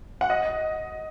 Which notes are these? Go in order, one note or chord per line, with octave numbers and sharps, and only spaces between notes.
F#5
D#5